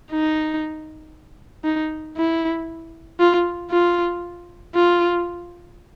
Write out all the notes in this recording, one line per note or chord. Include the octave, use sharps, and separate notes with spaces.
D#4
D#4
E4
F4
F4
F4